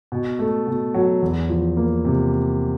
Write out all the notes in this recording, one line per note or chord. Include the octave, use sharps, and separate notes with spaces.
B2
A3
B2
F#3
E2
F3
A#3
C3